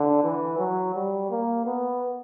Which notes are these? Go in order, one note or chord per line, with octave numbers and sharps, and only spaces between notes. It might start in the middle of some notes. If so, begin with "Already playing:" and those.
Already playing: D3
E3
F#3
G3
A#3
B3